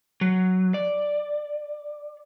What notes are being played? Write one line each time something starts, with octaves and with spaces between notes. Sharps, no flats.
F#3
D5